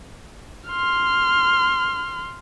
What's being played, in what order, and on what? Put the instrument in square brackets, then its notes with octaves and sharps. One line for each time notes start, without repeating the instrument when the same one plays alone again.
[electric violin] C6 F6